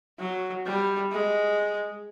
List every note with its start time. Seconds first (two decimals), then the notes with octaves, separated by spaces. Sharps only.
0.19 F#3
0.66 G3
1.12 G#3